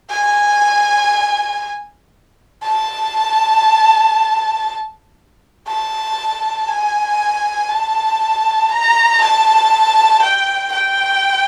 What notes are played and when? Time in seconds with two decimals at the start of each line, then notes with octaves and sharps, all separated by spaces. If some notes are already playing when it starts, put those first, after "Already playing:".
0.10 G#5
2.63 A5
5.67 A5
6.68 G#5
7.69 A5
8.69 A#5
9.21 A5
10.22 G5
10.72 G5